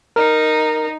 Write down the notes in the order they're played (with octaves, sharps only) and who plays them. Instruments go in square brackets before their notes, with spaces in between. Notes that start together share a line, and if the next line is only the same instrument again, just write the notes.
[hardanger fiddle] D#4 [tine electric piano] A#4